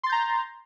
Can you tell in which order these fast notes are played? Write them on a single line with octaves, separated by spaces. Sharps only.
C6 A6 G6 A#5